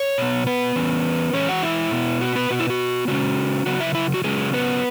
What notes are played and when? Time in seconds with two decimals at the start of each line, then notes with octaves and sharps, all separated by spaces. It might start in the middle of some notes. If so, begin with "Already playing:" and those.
Already playing: C#5
0.18 B2 B3
0.46 B3 B4
0.76 E3 C#4
1.33 E3 G#3 C#4 C#5
1.48 F#4 F#5
1.62 E4 E5
1.91 B2 B3
2.21 F#4
2.36 B3 B4
2.50 B2 B3 F#4
2.59 E4
2.70 F#4
3.08 C#3 G#3 C#4 F#4
3.66 C#3 F#3 B3 F#4
3.80 E4 E5
3.95 E4 E5
4.14 F#4
4.24 C#3 F#3 G#3 C#4 G#4
4.53 B3 B4